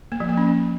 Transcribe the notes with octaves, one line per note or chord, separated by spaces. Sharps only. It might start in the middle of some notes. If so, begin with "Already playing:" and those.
A#3
F3
A#3
C#4